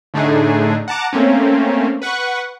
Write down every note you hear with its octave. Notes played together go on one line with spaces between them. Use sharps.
A2 D3 A3 D4 D#4 G#4
F#5 A5 A#5 D6
A3 A#3 C4 C#4
B4 F#5 C#6